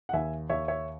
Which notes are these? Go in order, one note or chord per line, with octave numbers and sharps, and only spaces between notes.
F#5
D#2 E5 G#5
D#2 C#5 E5
C#5 E5